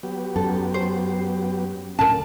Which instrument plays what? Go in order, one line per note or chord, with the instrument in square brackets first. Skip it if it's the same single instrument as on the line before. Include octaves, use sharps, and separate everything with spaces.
[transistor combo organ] F#3 B3 G4
[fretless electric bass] F#2 [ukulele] A4
[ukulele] C5
[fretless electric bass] D2 A2 C#4 [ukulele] A#4 A5